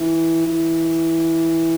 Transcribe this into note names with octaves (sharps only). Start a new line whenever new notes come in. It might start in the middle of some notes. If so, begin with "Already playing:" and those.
Already playing: E3
E3